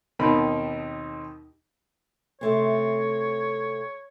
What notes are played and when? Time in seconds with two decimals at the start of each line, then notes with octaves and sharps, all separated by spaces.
0.19 D#2 B2 C4 D#4 A#4 B5
2.41 C3 A3 C4 C#5